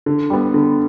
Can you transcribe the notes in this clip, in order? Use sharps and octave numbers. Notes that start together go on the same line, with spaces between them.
D3
G3 B3
D3